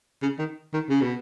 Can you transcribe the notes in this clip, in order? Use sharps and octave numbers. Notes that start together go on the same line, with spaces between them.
C#3
D#3
D#3
C#3
B2